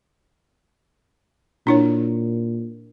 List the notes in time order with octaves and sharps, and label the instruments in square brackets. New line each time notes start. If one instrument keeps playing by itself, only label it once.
[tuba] A#2 [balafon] D4 E4 C#5